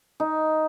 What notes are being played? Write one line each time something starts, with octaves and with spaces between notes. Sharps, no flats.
D#4